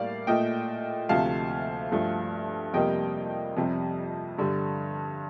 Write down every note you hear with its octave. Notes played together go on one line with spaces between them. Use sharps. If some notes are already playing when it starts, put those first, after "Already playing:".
Already playing: A2 G3 A#3 D5 F5
A#2 A3 D#5 G5
D2 C3 F3 A3 F5 A5
G2 F3 A3
F2 C3 G3 A#3 D#5 G5
F2 C3 G3
G2 D3 G3